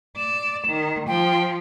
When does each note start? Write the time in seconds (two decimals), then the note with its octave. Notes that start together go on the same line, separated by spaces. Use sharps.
0.17 D5 E7
0.67 D#3
1.07 F3 G5